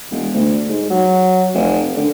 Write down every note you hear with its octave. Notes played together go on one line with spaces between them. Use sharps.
E1
D2
G#2
F#3
F1
D3